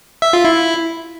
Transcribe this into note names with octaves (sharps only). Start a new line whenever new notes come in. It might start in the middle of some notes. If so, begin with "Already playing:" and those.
E5
F4
E4